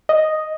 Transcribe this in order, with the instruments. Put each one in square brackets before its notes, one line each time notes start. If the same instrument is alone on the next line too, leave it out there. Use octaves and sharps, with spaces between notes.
[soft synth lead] D#5